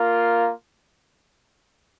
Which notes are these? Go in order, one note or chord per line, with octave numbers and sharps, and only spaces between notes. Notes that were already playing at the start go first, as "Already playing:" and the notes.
Already playing: A#3 F4 A#4 F5